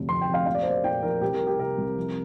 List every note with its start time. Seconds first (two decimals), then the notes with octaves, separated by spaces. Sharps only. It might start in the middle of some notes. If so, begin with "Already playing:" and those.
Already playing: F1 D2 C3
0.09 F2 C6
0.21 G5
0.28 F1
0.34 F5
0.46 A#1 F5
0.55 D5
0.62 C5
0.65 A#3
0.70 D5
0.84 A#2 G5
1.03 A#1 A#4
1.21 C2 G4
1.34 A#4
1.40 G3
1.47 G4
1.59 C3 A#4
1.78 C2
1.97 F2